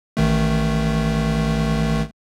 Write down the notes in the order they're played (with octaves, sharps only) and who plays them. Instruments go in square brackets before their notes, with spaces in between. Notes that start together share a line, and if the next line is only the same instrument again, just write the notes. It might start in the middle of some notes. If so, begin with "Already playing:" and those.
[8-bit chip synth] A1 D#3 A3